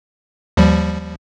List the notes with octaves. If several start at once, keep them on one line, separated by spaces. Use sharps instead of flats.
D#2 F3 G3